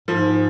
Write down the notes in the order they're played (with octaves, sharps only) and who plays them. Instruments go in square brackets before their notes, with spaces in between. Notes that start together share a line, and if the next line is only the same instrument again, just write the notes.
[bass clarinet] G#2 [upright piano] F3